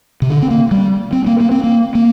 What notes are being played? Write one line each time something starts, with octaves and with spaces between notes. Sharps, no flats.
C3
D3
C4
A#3
G3
C4
A#3
A#3
C4
A#3
A#3